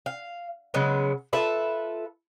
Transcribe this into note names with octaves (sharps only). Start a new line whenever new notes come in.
F5
C#3 F#3 G#3 B3
F4 A4 B4 E5